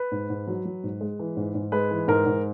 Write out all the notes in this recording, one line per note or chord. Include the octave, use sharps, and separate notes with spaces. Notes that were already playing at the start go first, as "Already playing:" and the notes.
Already playing: B4
G#2
G#2
F#3
F#3
G#2
G#3
E3
G#2
G#2
G#3 B4
E3
G#2 A#4
G#2